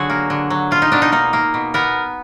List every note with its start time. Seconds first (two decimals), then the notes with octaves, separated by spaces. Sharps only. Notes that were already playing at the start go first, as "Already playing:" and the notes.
Already playing: D3 F#3 F#4 G#4
0.10 A#3
0.30 D3
0.50 F#3
0.71 B2 F4
0.82 D#4
0.92 B2 D4
1.02 D#4
1.12 A#3 D#4
1.33 A#3
1.54 B2
1.74 B3 A#4